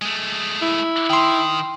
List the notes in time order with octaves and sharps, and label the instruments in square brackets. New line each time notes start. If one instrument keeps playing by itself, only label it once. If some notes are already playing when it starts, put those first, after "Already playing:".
[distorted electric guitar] G#3 A3
[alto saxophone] E4
[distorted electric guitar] D#3 [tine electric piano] G5 C6